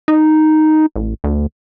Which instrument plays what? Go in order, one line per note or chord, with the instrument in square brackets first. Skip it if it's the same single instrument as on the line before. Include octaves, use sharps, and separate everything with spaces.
[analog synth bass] D#4
A1
D2